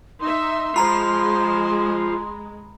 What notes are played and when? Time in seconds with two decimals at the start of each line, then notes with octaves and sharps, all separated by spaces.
0.20 D#4 E5 C6
0.76 G#3 F4 C5 A#5 B5